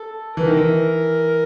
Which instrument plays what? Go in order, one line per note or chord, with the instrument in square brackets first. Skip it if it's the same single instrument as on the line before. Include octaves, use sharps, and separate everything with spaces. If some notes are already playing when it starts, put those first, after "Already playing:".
Already playing: [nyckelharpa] A4
[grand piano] E3 [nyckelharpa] A#4
[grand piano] D#3
E3